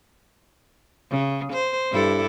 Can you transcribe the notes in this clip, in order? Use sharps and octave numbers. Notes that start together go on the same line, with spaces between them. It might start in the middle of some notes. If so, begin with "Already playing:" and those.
C#3
C5
G2 E4 A4